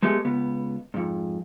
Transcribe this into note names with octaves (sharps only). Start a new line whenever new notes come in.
G#3 A3 B3 G4 G#4
C#2 B3
F2 G#2